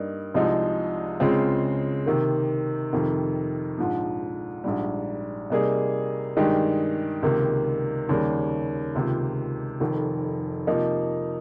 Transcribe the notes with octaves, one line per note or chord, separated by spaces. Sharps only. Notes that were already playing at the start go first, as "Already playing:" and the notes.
Already playing: G2 G3 A#3 D#4
C2 C3 F3 G#3 D#4
C#2 C#3 G#3 C4 F4
C3 D#3 A#3
F2 C3 D#3
A#1 G#2 F3
A#1 G#2 G3
C3 G3 A#3 D#4 G#4
G2 D#3 G#3 D#4 G4
C#2 C3 D#3 A#3
D#2 C#3 G3 A#3
C#2 C3 D#3 A#3 F4
F1 F2 D#3
C3 F3 A#3 D#4